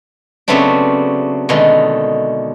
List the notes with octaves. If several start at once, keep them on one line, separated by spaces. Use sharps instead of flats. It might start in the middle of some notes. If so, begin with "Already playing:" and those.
C#3 F#3 A3 B3 C4 D4
B2 D3 D#3 G#3 A3